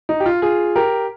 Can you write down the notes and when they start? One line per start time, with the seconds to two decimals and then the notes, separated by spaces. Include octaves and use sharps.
0.09 D#4
0.20 G4
0.26 F4
0.42 F4 G#4
0.76 G4 A#4